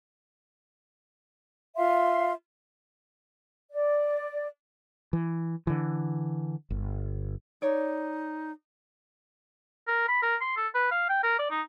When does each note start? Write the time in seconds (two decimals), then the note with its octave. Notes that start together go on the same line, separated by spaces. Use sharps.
1.77 F4 E5 F5 C6
3.71 D5
5.13 E3
5.67 D3 E3
6.70 G1
7.62 D#4 C#5 D5
9.88 A#4
10.09 B5
10.23 A#4
10.41 C6
10.57 A4
10.75 B4
10.91 F5
11.10 G5
11.23 A#4
11.39 D5
11.51 D#4